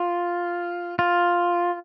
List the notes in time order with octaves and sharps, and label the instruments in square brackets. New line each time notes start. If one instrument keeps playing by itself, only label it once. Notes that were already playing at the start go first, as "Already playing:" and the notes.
Already playing: [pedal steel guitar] F4
F4